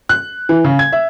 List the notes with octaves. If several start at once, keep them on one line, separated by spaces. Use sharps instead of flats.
F#6
E3
C#3
G#6
E5